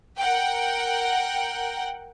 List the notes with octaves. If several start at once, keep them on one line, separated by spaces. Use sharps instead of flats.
A#4 F#5 G5